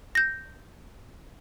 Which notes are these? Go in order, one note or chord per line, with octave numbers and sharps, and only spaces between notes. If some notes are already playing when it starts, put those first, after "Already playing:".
G6 A#6